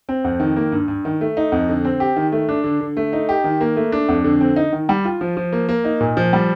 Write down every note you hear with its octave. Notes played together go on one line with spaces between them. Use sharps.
C4
F2
D#3
A#3
G2
G2
D#3
A3
D#4
F2
D3
C4
G4
D#3
A3
D4
D3
D3
A3
D#4
G4
D#3
A#3
A3
D4
F2
D3
C4
D#4
D#3
G3
F4
F3
F3
A#3
A#3
D#4
A#2
F3
G3